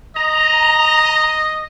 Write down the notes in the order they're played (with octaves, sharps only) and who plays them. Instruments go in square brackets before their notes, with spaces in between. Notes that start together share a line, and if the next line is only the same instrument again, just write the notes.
[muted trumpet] D#5 [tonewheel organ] A#5